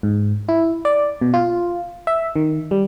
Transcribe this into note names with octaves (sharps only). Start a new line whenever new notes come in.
G#2
E4
D5
B2
F4
E5
D#3
G3